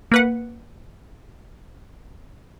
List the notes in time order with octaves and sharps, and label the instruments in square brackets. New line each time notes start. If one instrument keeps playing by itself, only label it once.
[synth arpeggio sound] A#3 B4 F#5